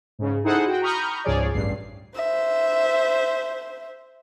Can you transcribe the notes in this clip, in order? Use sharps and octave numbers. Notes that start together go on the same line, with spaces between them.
G#2 C#3
D#4 E4 G#4 A4 C5 F#5
F#4 G5
A#5 B5 C#6 D#6 F6 G6
C#2 G#2 F3 G#4 C#5 D5
A1 G2 C7
C5 E5